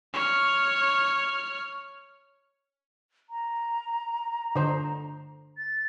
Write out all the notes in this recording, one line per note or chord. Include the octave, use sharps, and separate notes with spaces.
C#5 F6
A#5
D3 C5
A6